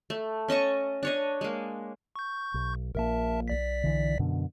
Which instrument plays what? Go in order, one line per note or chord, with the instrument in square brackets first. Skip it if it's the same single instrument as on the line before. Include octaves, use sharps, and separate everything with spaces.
[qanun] A3
C#4 D#5 A5 C#6
D4 C#5 D#5
G#3 A#3
[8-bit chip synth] C#6 G6
[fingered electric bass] B1
[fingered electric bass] A#1 A#2 [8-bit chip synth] A#4 E5 A5
[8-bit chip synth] B1 D5 B6
[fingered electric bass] D3 E3
F#2 B2 D3